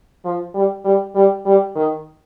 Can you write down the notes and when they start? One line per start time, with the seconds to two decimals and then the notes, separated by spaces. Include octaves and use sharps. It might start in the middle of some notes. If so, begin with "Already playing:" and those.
0.25 F3
0.54 G3
0.85 G3
1.15 G3
1.46 G3
1.76 D#3